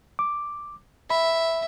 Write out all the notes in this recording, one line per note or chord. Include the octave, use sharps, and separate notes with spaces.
D6
E5 B5